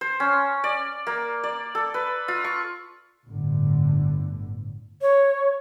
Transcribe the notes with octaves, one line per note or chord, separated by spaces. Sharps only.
C5
C#4
D5
A#3
D5
A4
B4
F4
C#6
G1 A2 D3
C#5